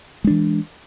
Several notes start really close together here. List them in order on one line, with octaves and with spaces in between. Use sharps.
G#3 D4 E3